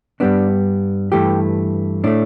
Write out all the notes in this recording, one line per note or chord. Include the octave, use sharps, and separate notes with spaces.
G2 G3 B3 D4
G2 E3 A3 G4
A2 A3 D4